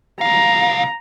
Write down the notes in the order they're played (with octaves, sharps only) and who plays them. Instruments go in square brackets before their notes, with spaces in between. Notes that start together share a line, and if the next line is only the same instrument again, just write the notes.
[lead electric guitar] C2 F5 [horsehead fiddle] A#5